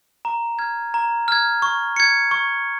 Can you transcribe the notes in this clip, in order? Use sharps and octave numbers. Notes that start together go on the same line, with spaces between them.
A#5
F6 G#6
A#5
F6 G#6
C#6
G#6 C#7
C#6